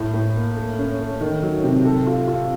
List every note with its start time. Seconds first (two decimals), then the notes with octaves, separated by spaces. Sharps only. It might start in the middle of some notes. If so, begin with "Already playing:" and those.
Already playing: A2
0.14 A2
0.35 A#3
0.57 A3
0.78 C#4
1.00 A3
1.21 D#3
1.43 F#3
1.64 C3
1.85 A4
2.07 F4
2.28 F4